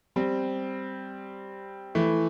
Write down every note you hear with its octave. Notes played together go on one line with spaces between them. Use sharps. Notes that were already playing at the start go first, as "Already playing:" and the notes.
G3 C4
E3 A3